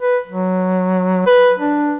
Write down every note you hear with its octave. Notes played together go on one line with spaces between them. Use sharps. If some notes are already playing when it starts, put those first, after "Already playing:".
B4
F#3
B4
D4